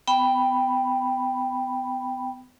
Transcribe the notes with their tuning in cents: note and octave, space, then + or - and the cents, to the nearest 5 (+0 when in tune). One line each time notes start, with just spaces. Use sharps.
B3 +35 G5 +0 B5 +0